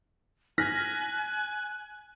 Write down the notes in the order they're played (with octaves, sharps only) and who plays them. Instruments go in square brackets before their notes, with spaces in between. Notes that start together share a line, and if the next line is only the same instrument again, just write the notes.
[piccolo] G#5 [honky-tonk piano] F6 A#6 B6 [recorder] F#6